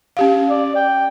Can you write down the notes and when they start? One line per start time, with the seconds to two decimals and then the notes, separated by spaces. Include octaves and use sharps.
0.17 C#4 G4 F5
0.50 D5
0.76 G5